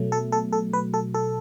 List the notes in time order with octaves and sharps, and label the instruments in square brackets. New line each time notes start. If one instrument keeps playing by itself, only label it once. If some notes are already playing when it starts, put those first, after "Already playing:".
Already playing: [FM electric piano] B2 F#3 A3
A4
A4
A4
B4
A4
A4